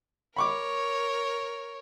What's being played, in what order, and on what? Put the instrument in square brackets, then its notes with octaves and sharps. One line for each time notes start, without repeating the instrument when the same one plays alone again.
[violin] A#4 C#5 [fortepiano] B5 C#6 D6